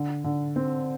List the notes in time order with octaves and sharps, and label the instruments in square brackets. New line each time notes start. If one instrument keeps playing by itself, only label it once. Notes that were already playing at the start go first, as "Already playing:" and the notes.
Already playing: [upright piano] D3
D3
C4